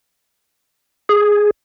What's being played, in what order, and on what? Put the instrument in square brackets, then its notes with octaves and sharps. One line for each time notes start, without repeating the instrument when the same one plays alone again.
[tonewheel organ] G#4